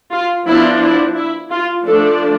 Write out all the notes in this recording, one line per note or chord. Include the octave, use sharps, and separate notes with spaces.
F4
F3 B3 D4 E4
E4
E4
F4
F3 A3 D4 A4